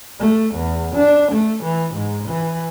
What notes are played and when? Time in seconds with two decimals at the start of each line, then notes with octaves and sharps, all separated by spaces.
0.20 A3
0.55 E2
0.95 D4
1.31 A3
1.63 E3
1.95 G#2
2.28 E3